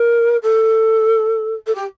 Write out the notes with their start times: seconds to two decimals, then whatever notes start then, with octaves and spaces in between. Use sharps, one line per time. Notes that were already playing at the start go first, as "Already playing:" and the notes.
Already playing: A#4
0.43 A4
1.66 A4
1.75 G4